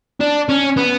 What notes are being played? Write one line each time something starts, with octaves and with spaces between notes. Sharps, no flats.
D4
C#4
B3